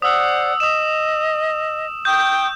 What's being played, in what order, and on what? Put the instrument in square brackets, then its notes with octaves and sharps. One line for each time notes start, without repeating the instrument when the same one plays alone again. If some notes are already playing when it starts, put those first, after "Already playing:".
[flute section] C5 D5 F#5 [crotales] D#6 E6
[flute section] D#5 [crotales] D#6 E7
[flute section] G5 C#6 D#6 [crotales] G6